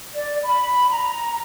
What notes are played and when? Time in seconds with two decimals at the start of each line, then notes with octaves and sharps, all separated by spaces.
0.13 D5
0.44 B5
0.89 A#5